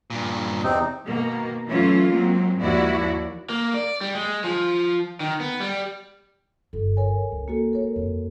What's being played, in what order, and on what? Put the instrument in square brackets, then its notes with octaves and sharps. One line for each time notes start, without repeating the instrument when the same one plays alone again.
[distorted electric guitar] G2 A#2
[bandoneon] E2 C3 C4 [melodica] D#4
[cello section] B2 D#3 A#3
E3 F#3 A3 C#4 F4
F#3 G#3 A#3 C4
D#2 G#2 F3 E4 F#4 D5
[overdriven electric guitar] A#3
D5
G3
G#3
F3
D#3
B3
G3
[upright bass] G1 F4 [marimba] A4
[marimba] A#4 C#5 G#5
[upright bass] C#2
[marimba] A#3 F#4 A4
[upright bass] G#3 [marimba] A#4 C#5
[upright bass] F2